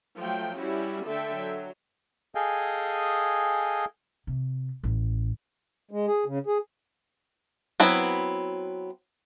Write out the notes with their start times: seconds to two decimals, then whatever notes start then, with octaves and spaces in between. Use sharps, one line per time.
0.18 F3 F#3 A3 G5
0.59 G3 C#4 E4 F#4
1.06 D3 A3 A4 E5 G5
1.36 F#3
2.35 G#4 A4 D#5 F5 G5 G#5
4.27 C3
4.83 A1
5.91 G#3
6.07 G#4
6.26 C#3
6.47 G#4
7.80 F#3 B3 C4 E4